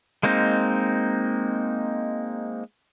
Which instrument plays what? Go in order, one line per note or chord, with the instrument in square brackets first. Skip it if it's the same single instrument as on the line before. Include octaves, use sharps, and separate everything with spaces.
[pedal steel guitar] G#3 A#3 C4 D#4